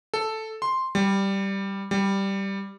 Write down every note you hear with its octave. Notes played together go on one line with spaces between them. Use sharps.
A4
C6
G3
G3